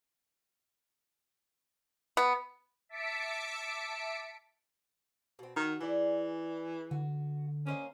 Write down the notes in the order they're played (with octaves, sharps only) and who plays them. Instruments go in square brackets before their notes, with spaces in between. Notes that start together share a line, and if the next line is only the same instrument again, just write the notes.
[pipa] B3
[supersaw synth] E5 A5 D6 B6 C#7 D7
[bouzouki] B2 C4
[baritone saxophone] D#3 [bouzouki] F#4
[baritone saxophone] E3 [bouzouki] G#4 D5
[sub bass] D3 [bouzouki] F#4
[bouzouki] A#3 C5 D#5 [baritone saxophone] C#4